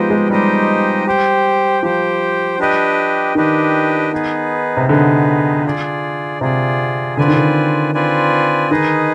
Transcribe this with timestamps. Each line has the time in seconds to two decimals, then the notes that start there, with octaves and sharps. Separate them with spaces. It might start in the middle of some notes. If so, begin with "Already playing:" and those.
Already playing: F3 G#3 B3 D#4 G4 C5 D#5 G5
0.10 G#3
0.30 G3 D#4 G4 C5 D#5 G5
1.06 G4 C5 G5
1.83 F3 G4 C5 G5
2.59 D4 G4 B4 D#5 G5
3.35 D#3 D4 G4 B4 D#5 G5
4.12 B3 D#4 G#4 B4
4.77 C3
4.89 D3 B3 D#4 G#4 B4
5.65 F4 G#4 D5
6.41 C3 F4 G#4 D5
7.17 D3 C4 F4 B4 D5 G#5
7.28 D#3
7.36 D3
7.94 C4 F4 B4 D5 G#5
8.71 D#3 D#4 G#4 B4 D#5